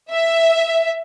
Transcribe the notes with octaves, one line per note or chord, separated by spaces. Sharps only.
E5